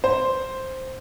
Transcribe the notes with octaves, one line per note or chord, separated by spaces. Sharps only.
C5